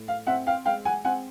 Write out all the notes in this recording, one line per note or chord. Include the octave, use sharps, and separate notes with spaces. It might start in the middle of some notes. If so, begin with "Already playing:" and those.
Already playing: A2
F5
C4 E5 F#5
F5 G5
G#3 F5 G5
F#5 G#5
C4 F#5 G#5